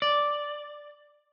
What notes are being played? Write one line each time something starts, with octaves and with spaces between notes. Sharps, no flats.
D5